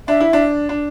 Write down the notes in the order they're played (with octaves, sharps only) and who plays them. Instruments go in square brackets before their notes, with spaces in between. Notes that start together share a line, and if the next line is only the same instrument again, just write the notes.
[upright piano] D4 [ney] E5
[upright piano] E4
D4
D4